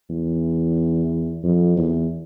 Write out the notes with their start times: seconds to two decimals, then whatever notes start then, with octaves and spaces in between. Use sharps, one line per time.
0.10 E2
1.44 F2
1.77 E2